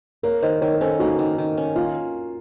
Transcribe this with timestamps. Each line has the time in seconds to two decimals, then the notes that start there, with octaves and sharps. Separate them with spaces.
0.23 A#3 A#4 C#5
0.42 D#3 C5 D#5
0.61 D#3 A#4 C#5
0.74 A#4
0.81 C#4 A4 C5
1.00 A#3 D#4 F#4
1.19 D#3
1.38 D#3
1.57 C#4
1.76 A#3 F4